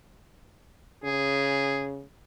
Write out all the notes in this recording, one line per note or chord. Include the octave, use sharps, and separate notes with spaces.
C#3 G#4